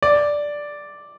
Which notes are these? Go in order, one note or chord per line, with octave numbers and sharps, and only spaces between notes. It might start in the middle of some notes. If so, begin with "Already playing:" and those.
D5